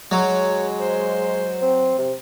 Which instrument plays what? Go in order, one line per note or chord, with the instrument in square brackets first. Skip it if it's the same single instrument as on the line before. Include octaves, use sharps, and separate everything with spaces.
[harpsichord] F#3 [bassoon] G#3 [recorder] C#5
[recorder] C5
[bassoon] C4
C3